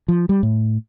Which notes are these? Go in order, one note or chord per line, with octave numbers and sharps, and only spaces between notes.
F3
G3
A2